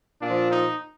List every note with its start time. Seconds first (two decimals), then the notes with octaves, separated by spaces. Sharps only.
0.22 A#2 F3 D4
0.52 D#4